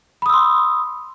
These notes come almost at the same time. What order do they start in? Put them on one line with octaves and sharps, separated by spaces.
B5 D#6 E6 C6